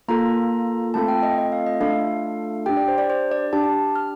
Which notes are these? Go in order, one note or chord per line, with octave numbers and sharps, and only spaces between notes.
A#3 F4 A4 A#5
A3 C4 F4 A4 A5
G5
D#5
D#5
F5
D#5
A3 D4 F4 A4 F5
D4 G4 G5
D5
C5
D5
C5
D5
D4 G4 A5
A5
F6